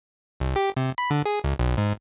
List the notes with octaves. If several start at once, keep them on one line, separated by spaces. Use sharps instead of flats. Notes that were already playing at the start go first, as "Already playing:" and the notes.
C2
G4
C3
B5
D3
G#4
C#2
B1
G#2